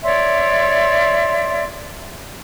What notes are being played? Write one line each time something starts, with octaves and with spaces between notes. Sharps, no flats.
C#5 D5 E5 C6